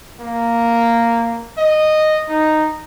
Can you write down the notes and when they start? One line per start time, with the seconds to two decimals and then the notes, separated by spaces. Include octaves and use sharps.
0.20 A#3
1.58 D#5
2.29 D#4